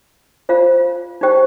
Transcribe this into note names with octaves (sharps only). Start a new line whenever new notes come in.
F4 C5 F5
D#4 G4 C5 G5